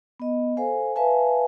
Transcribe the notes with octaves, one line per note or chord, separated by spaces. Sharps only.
B3 D#5
A4 C5 F5 G#5
B4 E5 F5 G#5 A5